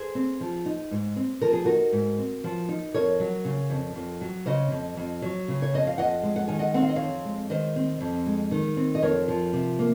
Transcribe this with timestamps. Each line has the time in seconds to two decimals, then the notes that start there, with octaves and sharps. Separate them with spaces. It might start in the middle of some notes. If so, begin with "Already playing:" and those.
Already playing: G#4 C5
0.15 C4
0.40 F3
0.66 D#4
0.91 G#2
1.16 C4
1.41 F3 A#4
1.53 G#4
1.65 D#4 F#4 A#4
1.92 G#2
2.19 C4
2.44 F3
2.69 D#4
2.94 F2 A#4 C#5
3.20 F#3
3.45 C#3
3.70 F2
3.95 F2
4.21 F#3
4.46 C#3 C5 D#5
4.71 F2
4.97 F2
5.22 F#3
5.48 C#3
5.62 C#5
5.73 F2 D#5
5.87 F5
5.98 F2 D#5 F#5
6.23 G#3
6.36 F#5
6.48 D#3 G#5
6.59 D#5 F#5
6.74 C4 F#5
6.82 F5
6.89 D#5
6.96 F2 C#5 F5
7.25 G#3
7.50 D#3 C5 D#5
7.76 C4
8.01 F2
8.26 G#3
8.51 D#3
8.77 C4
8.95 D#5
9.02 F2 A#4 C#5
9.28 F3
9.53 C3
9.79 A#3